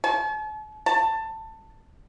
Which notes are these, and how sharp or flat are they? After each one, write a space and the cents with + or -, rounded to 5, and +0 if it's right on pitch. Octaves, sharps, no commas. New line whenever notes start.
A5 -45
A5 +15